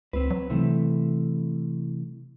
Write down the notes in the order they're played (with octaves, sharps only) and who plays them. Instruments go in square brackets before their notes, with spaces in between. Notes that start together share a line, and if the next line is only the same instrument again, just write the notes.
[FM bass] C#2 [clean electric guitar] C4 B4
[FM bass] F#3
[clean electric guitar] C3 E3 A3